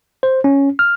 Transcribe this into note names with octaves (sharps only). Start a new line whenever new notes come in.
C5
C#4
F6